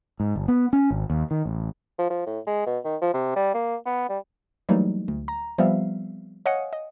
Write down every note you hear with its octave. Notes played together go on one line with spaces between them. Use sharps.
G#2
G1
B3
C#4
G#1
D#2
D#3
A1
F3
F3
A2
G#3
B2
D#3
F3
C3
G3
A#3
B3
G3
E3 F#3 G3 A3 A#3 D#4
D2
A#5
F3 G3 B3 C4 E5 F5
C#5 D#5 F5 F#5 G#5 C#7
D#5